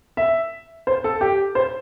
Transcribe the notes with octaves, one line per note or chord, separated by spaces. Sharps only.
E5
C5
A4
G4
C5